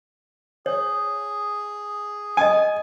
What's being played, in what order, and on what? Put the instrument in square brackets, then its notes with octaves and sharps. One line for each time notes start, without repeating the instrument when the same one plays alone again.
[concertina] G#4 [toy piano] C#5
[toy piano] D#5 D#6 [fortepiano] G#5